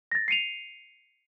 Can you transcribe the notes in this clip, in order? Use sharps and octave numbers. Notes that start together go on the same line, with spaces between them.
A6 A#6
C7 C#7 D#7 F7